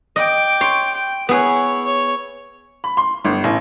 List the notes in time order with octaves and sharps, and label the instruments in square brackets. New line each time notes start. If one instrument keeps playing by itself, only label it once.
[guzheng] D#5 [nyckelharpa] G5 D6
[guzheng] C#5 C6
[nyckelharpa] G5
[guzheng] B3 G#4 [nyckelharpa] E4 C#5
[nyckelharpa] C#5
[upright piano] B5
C6
G1
A1